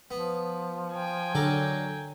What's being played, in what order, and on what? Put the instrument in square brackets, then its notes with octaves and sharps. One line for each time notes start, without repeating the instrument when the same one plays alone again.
[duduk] F3 [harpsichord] B3
[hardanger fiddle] G5 G#5
[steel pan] D3 [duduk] F#3 [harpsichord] D4 A4 A#4